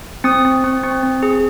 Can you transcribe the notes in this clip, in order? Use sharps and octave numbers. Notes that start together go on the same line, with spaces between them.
C4 D#6
C4
C4
C4
C4
G#4